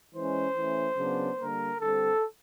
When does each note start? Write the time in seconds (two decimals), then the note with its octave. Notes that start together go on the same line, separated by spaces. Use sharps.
0.14 E3 G#3 C#4 C5
0.55 E3 A3 C#4
0.96 C#3 F#3 B3 D4
1.38 D3 G3 A#3 A#4
1.79 D3 G3 C4 A4